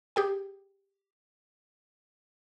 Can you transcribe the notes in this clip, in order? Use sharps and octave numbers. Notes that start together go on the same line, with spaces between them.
G4 G#4 G5